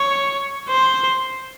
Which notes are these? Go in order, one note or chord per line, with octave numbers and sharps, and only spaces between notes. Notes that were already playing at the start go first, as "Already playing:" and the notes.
Already playing: C#5
C5